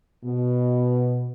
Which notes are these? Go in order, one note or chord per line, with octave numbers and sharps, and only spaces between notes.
B2